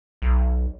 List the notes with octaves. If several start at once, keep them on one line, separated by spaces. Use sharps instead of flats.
B1